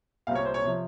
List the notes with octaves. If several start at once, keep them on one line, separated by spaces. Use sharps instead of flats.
C2 A#2 G3 C4 F5
C#5
C5
C#5
C3 F3